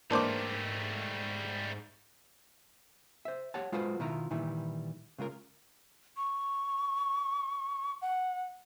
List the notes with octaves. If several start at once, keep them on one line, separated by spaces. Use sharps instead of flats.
G#2 E3 G3 A3 A#3 D4 C5 D6
C5 E5
G4 C#5 F#5 A5
G#3 F4 F#4 A4 B4 C5
B2 D#3 E4 F4 A#5
A#2 D#3 E3 G3 E4
C#3 G#3 F4 A#4
C#6
F#5